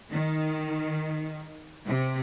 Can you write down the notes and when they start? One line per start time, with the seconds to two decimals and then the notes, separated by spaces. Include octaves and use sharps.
0.12 D#3
1.88 C3